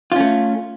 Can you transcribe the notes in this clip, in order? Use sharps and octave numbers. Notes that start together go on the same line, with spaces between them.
A3 C#4 F4